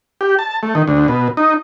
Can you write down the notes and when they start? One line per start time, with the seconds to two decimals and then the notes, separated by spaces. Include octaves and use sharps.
0.21 G4
0.39 A5
0.63 A3
0.75 D#3
0.88 D2
1.08 B2
1.37 D#4